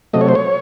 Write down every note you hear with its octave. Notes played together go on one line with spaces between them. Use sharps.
C3 F#3 A3 D#5
C#5
C5
C#5